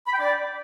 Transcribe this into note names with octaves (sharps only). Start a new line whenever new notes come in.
B5
G5
D5